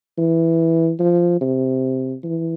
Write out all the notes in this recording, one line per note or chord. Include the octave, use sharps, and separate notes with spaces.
E3
F3
C3
E3